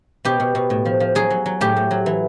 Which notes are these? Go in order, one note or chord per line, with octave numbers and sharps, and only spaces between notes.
B2 G4
B2
B2
A2
F3
F3
F#3 G#4
F#3
F#3
A2 G4
A2
F#3
E3